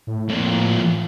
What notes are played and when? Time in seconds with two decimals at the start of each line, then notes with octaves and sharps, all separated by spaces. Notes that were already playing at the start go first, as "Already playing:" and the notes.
0.07 A2
0.29 F2 A#2